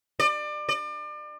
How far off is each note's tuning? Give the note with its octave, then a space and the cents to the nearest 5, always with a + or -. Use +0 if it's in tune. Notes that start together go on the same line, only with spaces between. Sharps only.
D5 +30
D5 +35